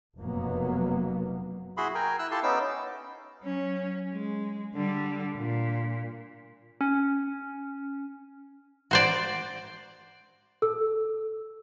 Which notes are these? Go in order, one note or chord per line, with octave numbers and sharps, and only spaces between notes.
F1 F#2 B2 F#3 A#3 B3
E4 F#4 G#4 B5 C6
A#4 G5 G#5 A#5
E4 E6 F#6
E4 F4 G4 A4 A5 C6
B3 C#4 D#4 D6 E6
F#3 C#4
G#3
D3 G3
A#2
C#4
F#4 C5 D5
A4 E6